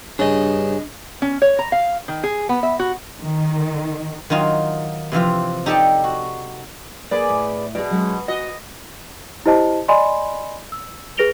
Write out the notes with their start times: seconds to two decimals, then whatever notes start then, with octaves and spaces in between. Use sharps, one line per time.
0.19 G2 C#3 D4 D#5
1.22 C#4
1.42 C#5
1.59 A#5
1.72 F5
2.08 D#3
2.24 G#4
2.49 B3
2.63 E5
2.79 F#4
3.20 D#3
4.30 D#3 F#3 D#4 F4
5.12 C3 E3 F3 F4
5.66 D#4 G4 A4 D5 G5 A5
6.04 F#4
7.11 A#3 G#4 B4 D5
7.29 A2
7.75 B2 G#4 D5
7.91 F#3 G#3 C#4
8.28 F#4 D#5
9.46 E4 G4 C5 D#5 A5
9.88 D5 D#5 G#5 B5 C6
10.72 E6
11.17 G#4 B4 A#6 D7 F7 G7